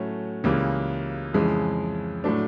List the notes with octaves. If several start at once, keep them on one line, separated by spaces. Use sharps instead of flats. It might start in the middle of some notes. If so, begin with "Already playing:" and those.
Already playing: A2 F#3 A3 C#4
C#2 C#3 E3 G3 A#3
F2 C#3 E3 G#3
A2 F#3 A3 D4